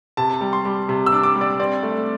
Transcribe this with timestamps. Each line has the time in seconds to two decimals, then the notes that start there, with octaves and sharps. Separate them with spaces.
0.17 C3 A5
0.41 G3
0.53 C6
0.65 G3
0.89 C3
1.06 E6
1.12 D4
1.23 D6
1.35 G3
1.41 D5
1.59 C4 D5
1.83 A3